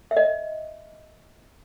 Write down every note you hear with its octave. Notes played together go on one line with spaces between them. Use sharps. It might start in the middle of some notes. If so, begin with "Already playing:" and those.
E5
D#5